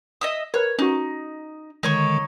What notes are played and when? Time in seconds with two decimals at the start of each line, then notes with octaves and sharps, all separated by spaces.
0.21 D#5 E5 D#6
0.54 A#4 B4 C#5
0.79 C#4 D#4 F#4
1.83 D3 D#3 G#3 D#4 C#5 C#6